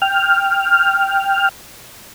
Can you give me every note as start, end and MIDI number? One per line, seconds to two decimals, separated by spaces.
0.02 1.49 79
0.02 1.49 89